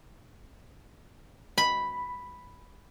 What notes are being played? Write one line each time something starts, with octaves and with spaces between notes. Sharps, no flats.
B5